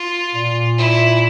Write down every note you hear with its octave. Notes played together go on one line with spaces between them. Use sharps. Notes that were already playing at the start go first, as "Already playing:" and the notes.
Already playing: F4
A#2
E4